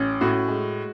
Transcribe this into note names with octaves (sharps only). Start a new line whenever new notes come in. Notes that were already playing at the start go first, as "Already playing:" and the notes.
Already playing: A1 C#4
A2 F#4
G#3